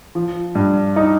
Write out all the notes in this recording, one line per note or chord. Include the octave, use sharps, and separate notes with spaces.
F3
G2
D#4